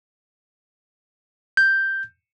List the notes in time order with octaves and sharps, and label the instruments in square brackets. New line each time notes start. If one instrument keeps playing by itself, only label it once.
[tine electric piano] G6